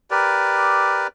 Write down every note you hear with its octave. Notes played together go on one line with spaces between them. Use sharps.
G4 A#4 B4 D5